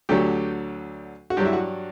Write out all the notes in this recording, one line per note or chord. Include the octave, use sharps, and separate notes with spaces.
D2 D3 F#3 G4
F#4
G2 F#3 G4
E4
F#4